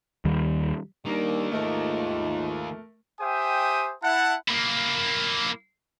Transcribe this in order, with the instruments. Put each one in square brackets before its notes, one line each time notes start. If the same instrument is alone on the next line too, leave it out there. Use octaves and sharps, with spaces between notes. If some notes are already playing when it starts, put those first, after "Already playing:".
[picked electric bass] D#2 D#3 G3
[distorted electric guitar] D#3 A#3 [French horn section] G3 D4 D#4 [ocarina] A#4
[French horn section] D#2 G#2 F4 [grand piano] A3 A#4 [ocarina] D#5
[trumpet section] G4 C5 E5 G5 G#5 D#6
E4 F#5 A5
[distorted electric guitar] A#3 E4